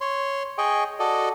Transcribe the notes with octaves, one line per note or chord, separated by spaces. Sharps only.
C#5 C6
G#4 D#5 G5 C#6
F#4 A4 D5 D#5